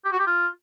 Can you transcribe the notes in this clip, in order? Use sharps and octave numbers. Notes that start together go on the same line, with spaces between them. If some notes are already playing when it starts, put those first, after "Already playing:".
G4
F#4
G4
F4